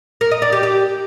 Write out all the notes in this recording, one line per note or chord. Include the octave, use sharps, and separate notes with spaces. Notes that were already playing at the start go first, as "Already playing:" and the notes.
A#4
D#5
D5
G4
G4